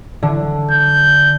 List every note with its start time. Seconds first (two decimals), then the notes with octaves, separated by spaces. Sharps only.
0.23 D3
0.71 G6